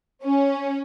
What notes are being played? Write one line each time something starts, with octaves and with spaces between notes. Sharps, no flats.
C#4